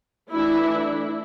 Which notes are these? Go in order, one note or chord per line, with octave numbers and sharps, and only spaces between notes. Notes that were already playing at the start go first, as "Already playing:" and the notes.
E3 A3 D4 E4